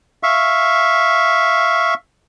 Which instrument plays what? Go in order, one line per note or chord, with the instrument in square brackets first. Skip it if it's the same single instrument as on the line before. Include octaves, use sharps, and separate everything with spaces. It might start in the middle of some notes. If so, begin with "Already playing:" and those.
[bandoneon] E5 F5 C#6